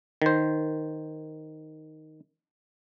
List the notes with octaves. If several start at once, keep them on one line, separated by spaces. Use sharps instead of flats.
D#3 C5